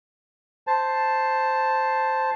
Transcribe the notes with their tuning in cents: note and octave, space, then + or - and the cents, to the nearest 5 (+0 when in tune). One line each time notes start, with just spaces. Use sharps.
C5 +0 A5 +0